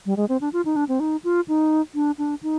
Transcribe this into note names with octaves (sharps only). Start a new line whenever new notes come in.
G3
G#3
C4
D4
F4
D#4
D4
C4
D#4
F4
D#4
D4
D4
D#4